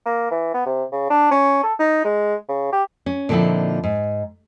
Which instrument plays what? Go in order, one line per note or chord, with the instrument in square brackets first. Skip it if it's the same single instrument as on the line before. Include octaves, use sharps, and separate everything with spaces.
[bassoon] A#3
E3
B3
C3
C#3
D4
C#4
A4
D#4
G#3
C#3
G4
[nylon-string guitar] C#4
A#2 D3 F3 C4 D#4 E4
G#2